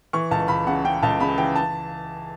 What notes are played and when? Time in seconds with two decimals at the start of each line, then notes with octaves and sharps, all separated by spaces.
0.13 E3 C#6
0.31 C#2 A5
0.48 C#2 B5
0.67 C#3 F#5
0.84 C#3 G5
1.03 C#2 A5
1.20 C#3 B5
1.38 E3 G5
1.55 A5